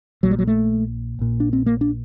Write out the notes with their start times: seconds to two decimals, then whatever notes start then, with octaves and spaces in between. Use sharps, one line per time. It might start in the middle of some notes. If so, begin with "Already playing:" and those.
0.23 A#1 A#2 F#3
0.31 G3
0.39 F#3
0.47 A3
1.19 A#1 A#2
1.40 D4
1.53 C4
1.66 A#3
1.81 D4